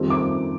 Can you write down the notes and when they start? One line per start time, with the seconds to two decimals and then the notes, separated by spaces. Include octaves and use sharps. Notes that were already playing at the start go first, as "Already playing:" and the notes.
Already playing: F2 D#3 G3 C4
0.10 D6